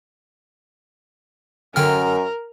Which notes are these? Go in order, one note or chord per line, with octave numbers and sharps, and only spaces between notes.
F#2 D3 A#4 G5 F6